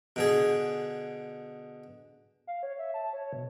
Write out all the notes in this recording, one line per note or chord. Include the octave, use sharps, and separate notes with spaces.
B2 D3 G#4
F5
C#5
E5
A5
C#5
B2